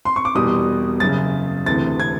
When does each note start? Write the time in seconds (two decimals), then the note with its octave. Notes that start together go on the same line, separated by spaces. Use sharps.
0.05 C6
0.16 C#6
0.25 D6
0.34 E1 E2 B2 G3 D#6
1.00 F#1 F#2 C#3 A6
1.66 D2 C3 E3 A6
2.00 G#6